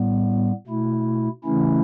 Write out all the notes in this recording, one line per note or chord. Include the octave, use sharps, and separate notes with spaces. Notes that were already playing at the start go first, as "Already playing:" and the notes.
Already playing: A2 G3 B3
B2 A3 E4
C#3 E3 A3 C#4 E4